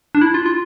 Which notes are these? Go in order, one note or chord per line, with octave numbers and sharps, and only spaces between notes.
D4
E4
F4
F4